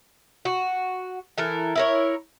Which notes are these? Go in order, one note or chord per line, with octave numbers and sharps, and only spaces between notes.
F#4
E3 A4 A#4
E4 A#4 C#5